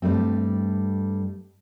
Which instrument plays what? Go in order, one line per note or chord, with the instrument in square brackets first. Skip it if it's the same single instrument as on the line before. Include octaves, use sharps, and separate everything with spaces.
[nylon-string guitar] G2 G3 A3 C4